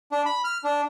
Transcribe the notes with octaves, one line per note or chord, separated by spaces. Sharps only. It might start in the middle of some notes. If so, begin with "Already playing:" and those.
D4
B5
F6
D4